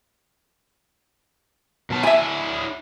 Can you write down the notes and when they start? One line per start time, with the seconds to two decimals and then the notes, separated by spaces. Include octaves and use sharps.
1.90 B2 F#3 A5
2.03 D4 E4 E5 G#5